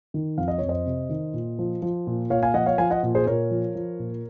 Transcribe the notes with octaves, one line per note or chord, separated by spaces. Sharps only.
D#3
F2 F5
D#5
F2 C#5
C5 D#5
C3
D#3
A#2
F3
F3
A#2
A#2 C#5 F5
F5 G#5
F3 D#5 F#5
C#5 F5
F3 F5 G#5
D#5 F#5
A#2
G#4 C5
A#2 A#4 C#5
F3
F3
A#2